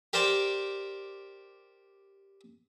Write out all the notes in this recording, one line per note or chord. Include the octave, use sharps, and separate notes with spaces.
G4 A#4 C5 D5 G5